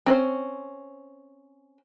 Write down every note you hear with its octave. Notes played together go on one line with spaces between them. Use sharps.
C4 C#4 C5